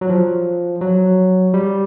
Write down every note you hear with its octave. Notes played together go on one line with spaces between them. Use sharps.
F#3
F3
F#3
G3